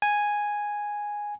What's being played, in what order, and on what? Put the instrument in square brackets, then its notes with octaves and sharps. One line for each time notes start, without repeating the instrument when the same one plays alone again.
[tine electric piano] G#5